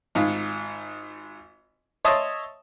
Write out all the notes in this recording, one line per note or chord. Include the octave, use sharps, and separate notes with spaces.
G#1 G#2 F4
C#5 D#5 E5 A5 C6 D#6